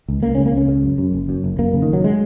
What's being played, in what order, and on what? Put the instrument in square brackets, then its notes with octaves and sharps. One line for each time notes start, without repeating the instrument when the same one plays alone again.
[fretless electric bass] C#2
C#2 A#3
C#4
C#3
A#3
C#2 C#4
C#3
F#2
F#2
F#1
F#2
F#1
F#2 A#3
C#3
D#3
F#1 F#3
G#3